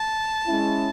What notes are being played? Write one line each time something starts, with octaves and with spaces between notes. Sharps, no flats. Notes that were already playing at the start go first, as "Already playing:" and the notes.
Already playing: A5
G#3 C#4 E4